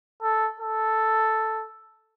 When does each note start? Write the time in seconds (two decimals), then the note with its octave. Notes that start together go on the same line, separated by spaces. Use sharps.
0.23 A4
0.60 A4